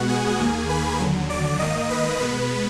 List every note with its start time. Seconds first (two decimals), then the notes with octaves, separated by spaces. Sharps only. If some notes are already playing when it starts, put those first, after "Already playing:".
Already playing: B2 G#3 B3 F#4 F#5
0.09 G#4 G#5
0.39 D#2 D#3 A#3
0.69 B4 B5
1.00 D#2 D3 F#3
1.29 D5 D6
1.59 G#2 D#3 A#3 D#5 D#6
1.89 B4 B5
2.20 B2 G#3 B3 B4 B5